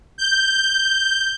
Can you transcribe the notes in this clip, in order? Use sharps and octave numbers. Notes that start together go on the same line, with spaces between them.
G6